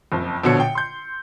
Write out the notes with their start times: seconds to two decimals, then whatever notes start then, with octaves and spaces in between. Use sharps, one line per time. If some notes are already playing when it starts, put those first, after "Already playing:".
0.12 F#1 F2
0.43 A#1 B2 D3 C#5 C#7
0.60 G5
0.75 C6 G6